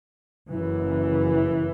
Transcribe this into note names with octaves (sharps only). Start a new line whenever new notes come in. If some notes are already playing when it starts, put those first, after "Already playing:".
F#1 F#2 C#3 E3